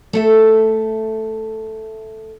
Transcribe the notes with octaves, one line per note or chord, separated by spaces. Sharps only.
A3 A4 E5